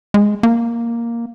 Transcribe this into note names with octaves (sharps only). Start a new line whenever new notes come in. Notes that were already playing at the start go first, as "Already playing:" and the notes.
G#3
A#3